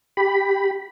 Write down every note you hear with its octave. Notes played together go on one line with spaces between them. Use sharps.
G4 B5